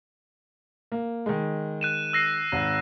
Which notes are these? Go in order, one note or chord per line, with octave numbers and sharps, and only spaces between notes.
A#3
D#3 G#3
F#6 D#7 E7
E6 A#6 C7
G#1